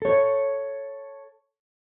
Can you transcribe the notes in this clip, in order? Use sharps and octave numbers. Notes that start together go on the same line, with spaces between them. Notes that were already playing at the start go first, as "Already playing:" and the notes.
A4 C#5